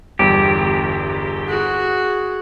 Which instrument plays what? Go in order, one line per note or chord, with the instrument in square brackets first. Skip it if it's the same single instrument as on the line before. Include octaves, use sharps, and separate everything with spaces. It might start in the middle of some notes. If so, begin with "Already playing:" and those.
[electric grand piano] G1 E2 G3 [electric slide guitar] G4
[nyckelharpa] F#4 G#4